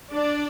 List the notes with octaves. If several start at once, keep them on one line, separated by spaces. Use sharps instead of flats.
D4 D5